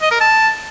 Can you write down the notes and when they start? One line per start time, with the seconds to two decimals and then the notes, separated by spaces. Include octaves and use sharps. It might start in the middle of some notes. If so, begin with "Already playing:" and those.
0.01 D#5
0.11 A#4
0.20 A5